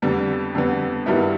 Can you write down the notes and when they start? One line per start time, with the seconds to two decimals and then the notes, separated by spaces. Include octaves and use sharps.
0.02 F2 D3 G3 B3
0.54 F2 D3 G3 B3
1.06 G2 D#3 G3 B3 E4